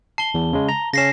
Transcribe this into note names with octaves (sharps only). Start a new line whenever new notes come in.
A5 C7 G7
E2
C#3 G#3
A#5
C#3 C#4 A#6 C7 E7